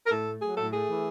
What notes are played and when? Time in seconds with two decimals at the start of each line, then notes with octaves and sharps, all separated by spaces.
0.06 A#4
0.11 A2 A4
0.26 A3
0.42 F#3 G#4
0.58 A2 A4
0.73 A3 G#4
0.89 E3